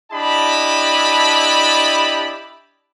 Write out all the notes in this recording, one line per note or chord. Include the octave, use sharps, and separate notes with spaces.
D4 E4 G4 D#5 A5 B5